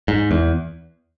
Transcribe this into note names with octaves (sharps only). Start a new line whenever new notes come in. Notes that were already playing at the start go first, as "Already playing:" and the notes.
G#2
E2